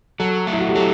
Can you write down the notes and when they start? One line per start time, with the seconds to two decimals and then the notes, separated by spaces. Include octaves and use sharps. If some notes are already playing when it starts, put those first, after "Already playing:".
0.20 F#3 A4
0.47 A3
0.53 E4
0.60 F#4
0.68 G4
0.75 F#3 A4